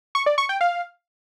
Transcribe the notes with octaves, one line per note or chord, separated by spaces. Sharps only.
C#6
D5
C#6
G5
F5